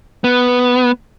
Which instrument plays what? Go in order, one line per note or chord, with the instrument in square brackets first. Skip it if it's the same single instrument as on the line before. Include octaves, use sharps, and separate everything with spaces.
[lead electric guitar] B3